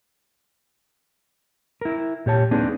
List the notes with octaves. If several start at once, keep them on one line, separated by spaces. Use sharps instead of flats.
E4 A#4
A#2 G4 C#5 A5
A#3 C4 D4 D#4 G#4 B4